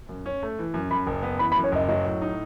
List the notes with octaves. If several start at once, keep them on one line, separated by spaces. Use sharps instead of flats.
F#2
C#4
A3
E3
F#2
F#2 B5
F#1
B3
E3 B5
B5
F#2
C#5
F#1 D#5
F#3 D#5
A2
D#4